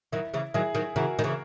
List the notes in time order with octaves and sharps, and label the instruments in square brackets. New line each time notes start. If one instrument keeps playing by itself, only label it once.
[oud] D#3 F#3 [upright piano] E4
[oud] C#3 E3
[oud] D#3 F#3 [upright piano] E4 G#4
[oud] D#3 F#3
[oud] C#3 E3 [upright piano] F#4 A#4
[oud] D#3
C#3 E3